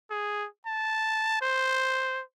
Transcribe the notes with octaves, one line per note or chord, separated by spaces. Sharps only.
G#4
A5
C5